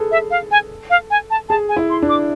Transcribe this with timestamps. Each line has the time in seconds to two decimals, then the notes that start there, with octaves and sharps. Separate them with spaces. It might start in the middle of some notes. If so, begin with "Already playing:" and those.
Already playing: G#4 A4 B4
0.11 E5
0.31 F5
0.51 G#5
0.90 F5
1.10 G#5
1.30 A5
1.49 G#4 A5
1.69 G#5
1.77 E4
1.90 C6
2.02 D4
2.09 D6